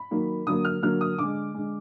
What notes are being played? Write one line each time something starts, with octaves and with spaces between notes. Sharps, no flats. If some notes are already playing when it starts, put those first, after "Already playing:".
Already playing: B5
D#3 F#3 A#3
D3 F#3 A#3 D#6
F6
D3 F#3 A#3 F6
D#6
D3 G#3 D6
D3 G#3